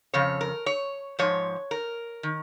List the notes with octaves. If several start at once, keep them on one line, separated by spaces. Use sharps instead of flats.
F2 C#3 C#5
A#4
C#5
G#2 F3 C#5
A#4
D#3